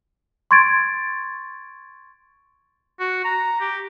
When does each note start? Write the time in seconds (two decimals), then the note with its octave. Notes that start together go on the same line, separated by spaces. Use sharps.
0.51 C6 C#6 G#6 A6 D7
3.00 F#4
3.24 A#5
3.61 G4